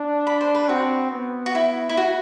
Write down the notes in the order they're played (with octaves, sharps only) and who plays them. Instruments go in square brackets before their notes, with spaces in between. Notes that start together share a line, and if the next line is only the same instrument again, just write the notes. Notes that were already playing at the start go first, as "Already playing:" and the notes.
Already playing: [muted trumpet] D4
[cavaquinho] B5
C5
B4
[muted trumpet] C4 [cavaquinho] F#4
[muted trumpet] B3
[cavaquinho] F#4
E4
E4
F#4